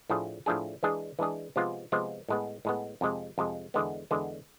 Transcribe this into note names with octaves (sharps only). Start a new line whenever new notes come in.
A2 F3 A3 D4 G#4
A2 F3 A3 D4 G#4
E3 G#3 D4 G#4
E3 G#3 D4 G#4
C3 F3 G#3 B3 F4
C3 F3 G#3 B3 F4
A2 G#3 B3
A2 G#3 B3
F2 C3 G#3
F2 C3 G#3
E2 D3 G#3 B3
E2 D3 G#3 B3